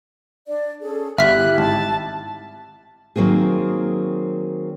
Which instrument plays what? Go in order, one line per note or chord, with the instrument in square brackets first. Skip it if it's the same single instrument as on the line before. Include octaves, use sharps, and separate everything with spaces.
[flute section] D4 D5
C#4 G#4 A4
[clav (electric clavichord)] G1 [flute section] E4 G4 [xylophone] E5 F6 B6 [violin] F#6
[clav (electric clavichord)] G#1 [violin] A5 A6
[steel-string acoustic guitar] D#3 F#3 A#3 C4 G#4